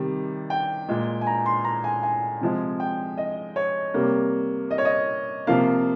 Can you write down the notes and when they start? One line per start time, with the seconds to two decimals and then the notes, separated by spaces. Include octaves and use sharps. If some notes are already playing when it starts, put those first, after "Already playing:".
Already playing: C3 D#3 G3
0.50 G5
0.89 A#2 G#3
1.21 G#5
1.27 A#5
1.46 C6
1.64 A#5
1.84 G#5
2.03 G#5
2.41 C3 F3 G#3
2.80 G5
3.18 D#5
3.56 C#5
3.94 C3 G3 A#3
4.71 D#5
4.78 C#5
4.85 D#5
5.47 C3 F3 A#3 F5